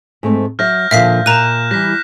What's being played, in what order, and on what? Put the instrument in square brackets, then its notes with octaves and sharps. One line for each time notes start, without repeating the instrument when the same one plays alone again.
[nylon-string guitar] G#2 A3 C4
[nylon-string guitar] F#3 E5 [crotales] F6 G6 A#6
[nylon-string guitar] A#2 D3 F3 [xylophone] E5 F5 B6
[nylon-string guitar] A#2 [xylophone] A#5 D#7 [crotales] F#6 G6 E7
[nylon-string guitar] E3 G3 [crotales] A#6 B6